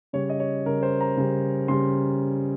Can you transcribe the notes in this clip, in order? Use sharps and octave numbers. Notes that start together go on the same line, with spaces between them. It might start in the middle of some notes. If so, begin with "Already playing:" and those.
C#3 G3 C#5
D#5
C#5
C#3 G3 A#4
C5
A#5
C#3 G3
C#3 G3 C6